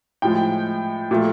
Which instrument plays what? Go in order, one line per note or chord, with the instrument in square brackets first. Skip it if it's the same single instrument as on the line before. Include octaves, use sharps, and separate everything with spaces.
[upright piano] A2 F3 G#3 G5
A#2 F3 A3